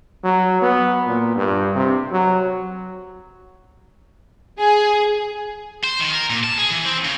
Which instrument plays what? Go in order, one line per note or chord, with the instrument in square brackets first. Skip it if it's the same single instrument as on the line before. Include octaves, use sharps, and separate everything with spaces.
[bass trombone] F#3
B3
A#2
G2
C3
F#3
[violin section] G#4
[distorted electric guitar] C5
D#3
A#4
A#2
A5
G#4
E3
C4
C#3